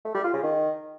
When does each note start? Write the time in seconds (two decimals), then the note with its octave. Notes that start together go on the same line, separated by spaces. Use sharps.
0.05 A3
0.15 G3
0.24 F4
0.34 C#3
0.43 D#3